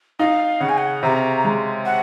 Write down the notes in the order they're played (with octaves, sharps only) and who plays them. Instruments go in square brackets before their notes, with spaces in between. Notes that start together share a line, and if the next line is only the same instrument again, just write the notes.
[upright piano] D#4 [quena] F5
[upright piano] C#3 [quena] F#5
[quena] G#5
F#5
[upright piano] C3 [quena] A#5
[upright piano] G#3
[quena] F#5